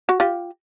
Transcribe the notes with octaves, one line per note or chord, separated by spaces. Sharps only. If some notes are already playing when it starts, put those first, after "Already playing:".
F#4
F4 G4